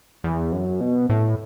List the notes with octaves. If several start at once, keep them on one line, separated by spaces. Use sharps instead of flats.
E2
F#2
B2
A2